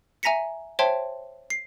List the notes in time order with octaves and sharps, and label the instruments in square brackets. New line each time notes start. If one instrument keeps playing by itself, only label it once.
[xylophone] E5 G#5 A#5 A#6 B6 C#7
C5 C#5 E5 G5 A5 C6
C7